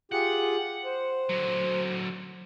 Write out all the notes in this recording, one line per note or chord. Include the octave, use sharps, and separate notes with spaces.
F4 G4 G#4 F#5
C5
D3 F#3